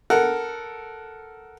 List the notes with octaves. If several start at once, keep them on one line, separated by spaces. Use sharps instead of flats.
A4 A#4 F#5